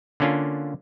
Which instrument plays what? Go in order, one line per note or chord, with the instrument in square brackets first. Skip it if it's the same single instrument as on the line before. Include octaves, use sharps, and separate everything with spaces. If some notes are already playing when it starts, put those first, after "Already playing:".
[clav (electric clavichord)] D3 A#3 C#4 D4 F4